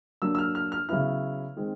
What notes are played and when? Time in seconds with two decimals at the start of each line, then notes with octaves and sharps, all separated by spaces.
0.22 F#3 A#3 D4 E6
0.35 E6
0.39 F6
0.55 F6
0.72 F6
0.89 C#3 F#3 B3 E4 F6
1.56 D#3 G#3 C4